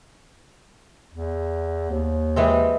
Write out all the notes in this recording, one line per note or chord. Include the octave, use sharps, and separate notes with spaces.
E2
D#2
E3 G#3 C4